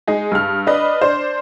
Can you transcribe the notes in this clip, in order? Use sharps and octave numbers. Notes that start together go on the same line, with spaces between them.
G#3 D#4 G#4
G2 F6
D4 B4 D#5
D4 C5